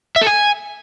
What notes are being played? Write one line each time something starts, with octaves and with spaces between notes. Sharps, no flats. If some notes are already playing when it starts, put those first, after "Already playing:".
E5
A4
G#5